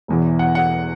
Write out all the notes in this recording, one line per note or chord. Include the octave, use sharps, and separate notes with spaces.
E1 E2 E3
F#5
F#5